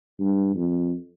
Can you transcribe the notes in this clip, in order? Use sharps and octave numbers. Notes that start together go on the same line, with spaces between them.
G2
F2